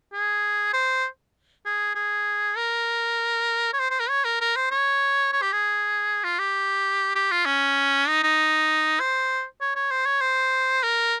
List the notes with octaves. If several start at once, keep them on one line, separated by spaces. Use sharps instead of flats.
G#4
C5
G#4
G#4
A#4
C#5
C5
C5
A#4
C#5
A#4
A#4
C5
C#5
C#5
G4
G#4
F4
G4
G4
F4
C#4
D#4
D#4
C5
C#5
C#5
C5
C#5
C5
A#4